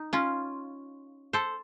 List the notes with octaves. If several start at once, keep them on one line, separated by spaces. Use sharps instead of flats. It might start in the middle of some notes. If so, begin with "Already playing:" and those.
Already playing: D#4
C#4 F4
A4 C5